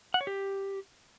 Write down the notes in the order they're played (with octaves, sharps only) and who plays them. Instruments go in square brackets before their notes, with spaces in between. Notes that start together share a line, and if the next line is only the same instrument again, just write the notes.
[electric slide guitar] F#5
C#5
G4